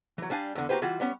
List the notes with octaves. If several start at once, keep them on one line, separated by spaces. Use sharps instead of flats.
E3 F#3
G3 D4 F5 G#5
E2 D3
A#3 F#4 G4 B4 C5
E3 G3 F4 F#4
G3 B3 C#4